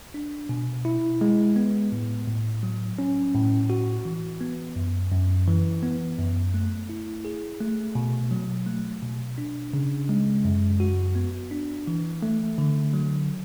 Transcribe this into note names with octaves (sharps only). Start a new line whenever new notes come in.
D4
B2
E4
G#3
B3
A2
A2
F#3
C#4
A2
F#4
E3
B3
F#2
F#2
E3
B3
F#2
A3
E4
G#4
A3
B2
F#3
A3
B2
D4
C#3
G#3
F#2
F#4
B3
D4
E3
A3
D3
F#3